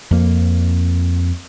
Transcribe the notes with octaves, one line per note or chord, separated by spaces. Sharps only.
F2 A#3